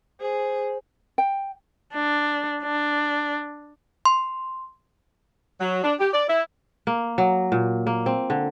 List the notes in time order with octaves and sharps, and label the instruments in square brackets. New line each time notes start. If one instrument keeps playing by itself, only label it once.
[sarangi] G#4 [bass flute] C5
[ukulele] G5
[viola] D4
D4
[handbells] C6
[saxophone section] F#3
D4
G4
D5
E4
[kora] A#3
F#3
A#2
A#3
C4
D3